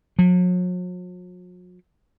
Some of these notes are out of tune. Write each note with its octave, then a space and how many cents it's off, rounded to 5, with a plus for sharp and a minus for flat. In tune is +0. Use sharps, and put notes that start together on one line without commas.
F#3 -45